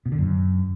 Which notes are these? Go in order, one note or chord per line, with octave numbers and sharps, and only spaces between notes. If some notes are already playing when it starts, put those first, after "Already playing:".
B2
D3
F#2